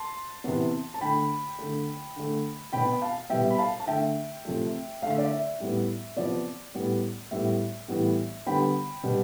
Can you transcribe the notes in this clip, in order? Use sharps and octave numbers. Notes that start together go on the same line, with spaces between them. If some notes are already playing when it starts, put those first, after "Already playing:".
Already playing: A5 C6
C3 E3 B3
A5
D3 A3 G5 B5
D3 A3
D3 A3
B2 B3 G5 B5
F5 A5
B2 G3 B3 E5 G5
B5
F5 A5
A5
D3 A3 E5 G5
C3 F3 A3
D3 A3 E5 F5
D5
E5
A2 G3 B3
C3 F3 B3 D5
A2 G3 B3
A2 G3 B3 E5
A2 E3 G3 B3
D3 G3 B3 G5 B5
B2 G3 B3